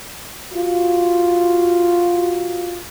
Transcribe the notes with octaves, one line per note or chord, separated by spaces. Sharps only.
F4 F#4